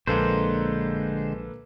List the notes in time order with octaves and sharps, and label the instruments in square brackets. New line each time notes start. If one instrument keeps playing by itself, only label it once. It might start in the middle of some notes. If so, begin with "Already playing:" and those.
[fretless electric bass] A#1 [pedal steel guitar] D3 G#3 C5 [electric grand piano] A#3 A4 B4